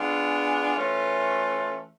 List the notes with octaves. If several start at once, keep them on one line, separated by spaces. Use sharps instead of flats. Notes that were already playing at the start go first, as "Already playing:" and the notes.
Already playing: G#3 B3 D4 F4
E3 A3 C#4 F4